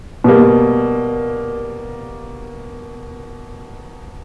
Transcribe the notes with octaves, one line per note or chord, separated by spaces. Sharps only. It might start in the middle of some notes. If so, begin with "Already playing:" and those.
B2 G3 A#3